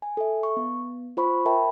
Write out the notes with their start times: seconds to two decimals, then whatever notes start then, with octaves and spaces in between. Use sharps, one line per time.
0.02 G#5
0.17 A4 E5
0.43 C#6
0.57 B3
1.17 F4 C5 B5 C#6
1.46 A#4 E5 G5 A5 B5